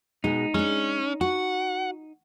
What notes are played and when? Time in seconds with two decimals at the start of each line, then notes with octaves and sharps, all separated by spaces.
0.24 B2 G#3 D#4
0.54 G#3 C#4 D4
1.21 F#4 F#5